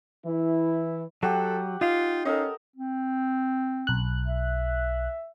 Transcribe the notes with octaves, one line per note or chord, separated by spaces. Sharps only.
E3 E4
F#3 G4 A4 F#5
D#4 F4 F5
C#4 A4 A#4 D#5
C4
B1 F#6
E5